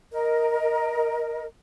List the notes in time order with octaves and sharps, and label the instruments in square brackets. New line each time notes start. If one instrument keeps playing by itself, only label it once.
[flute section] A#4 D#5